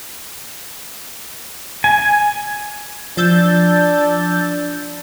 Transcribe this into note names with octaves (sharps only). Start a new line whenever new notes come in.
G#5
F3 D4 E6 G6 A6